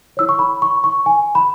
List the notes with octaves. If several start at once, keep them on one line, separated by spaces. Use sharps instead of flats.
E4 C#5 E6
C#6
B5
C#6
C#6
G#5
B5